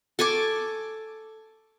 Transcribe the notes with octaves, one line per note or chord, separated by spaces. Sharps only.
A4 G#5 C#6 D6